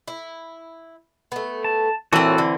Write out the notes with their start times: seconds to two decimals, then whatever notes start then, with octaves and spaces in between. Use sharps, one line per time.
0.08 E4
1.32 A3 B3
1.64 A5
2.13 A#2 E3 C4 F#4 A4 C#5 A5
2.38 D3